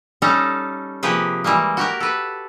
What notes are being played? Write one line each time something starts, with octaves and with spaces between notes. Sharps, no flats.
G3 C#4 D#4 A4 A#5
C3 F3 A#3 G4 G#4 B4
E3 G3 G#3 A#3
F#4 G4 A#4
A4 B4